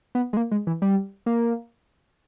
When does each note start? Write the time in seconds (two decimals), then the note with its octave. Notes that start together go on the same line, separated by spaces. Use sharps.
0.15 B3
0.33 G#3
0.37 A#3
0.51 G#3
0.67 E3
0.82 G3
1.26 A#3